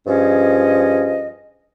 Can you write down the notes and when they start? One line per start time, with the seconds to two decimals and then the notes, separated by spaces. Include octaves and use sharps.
0.07 G2 F3 C#4 G#4 D#5